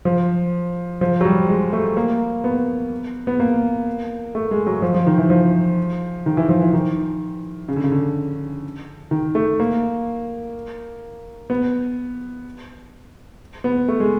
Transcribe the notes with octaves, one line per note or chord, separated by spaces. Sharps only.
F3
F3
F#3
G3
G#3
A3
A#3
B3
B3
A#3
A3
G#3
F#3
F3
F3
D#3
E3
F3
D#3
E3
F3
E3
D#3
C#3
D3
C#3
D3
D#3
A3
A#3
B3
B3
A3
G#3